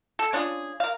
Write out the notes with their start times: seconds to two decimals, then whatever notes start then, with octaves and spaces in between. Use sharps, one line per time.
0.19 A4
0.33 C#4 D4 F4 G#4
0.80 A#4 F5